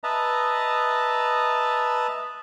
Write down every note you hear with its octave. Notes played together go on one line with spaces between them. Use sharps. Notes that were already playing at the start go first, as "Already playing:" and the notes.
B4 D#5 E5 A5 A#5